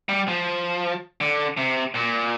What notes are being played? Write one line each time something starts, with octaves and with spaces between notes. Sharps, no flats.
G3
F3
D3
C3
A#2